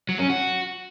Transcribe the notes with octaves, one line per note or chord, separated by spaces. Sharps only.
F#3
C#4
F#4